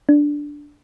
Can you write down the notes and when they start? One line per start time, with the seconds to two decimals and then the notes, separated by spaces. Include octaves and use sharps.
0.09 D4